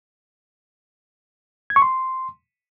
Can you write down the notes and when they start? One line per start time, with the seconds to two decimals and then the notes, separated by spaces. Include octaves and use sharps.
1.70 G#6
1.76 C#6
1.82 C6